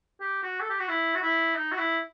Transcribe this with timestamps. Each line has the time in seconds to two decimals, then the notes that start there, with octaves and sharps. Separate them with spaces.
0.20 G4
0.43 F#4
0.60 A4
0.70 G4
0.79 F#4
0.88 E4
1.15 F#4
1.21 E4
1.55 D#4
1.72 F#4
1.78 E4